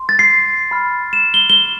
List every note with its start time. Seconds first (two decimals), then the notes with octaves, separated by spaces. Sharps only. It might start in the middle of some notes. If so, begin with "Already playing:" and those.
Already playing: C6
0.09 A6
0.19 C7
0.71 B5 F6
1.13 E7
1.34 G7
1.50 G7